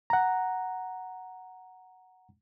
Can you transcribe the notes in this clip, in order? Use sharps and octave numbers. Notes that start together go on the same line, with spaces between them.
F#5 A#5